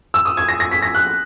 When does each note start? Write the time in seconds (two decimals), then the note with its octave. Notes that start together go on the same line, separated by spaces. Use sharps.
0.14 E6
0.25 D#6
0.37 G#6
0.49 A#6
0.60 A#6
0.71 B6
0.82 A#6
0.95 F#6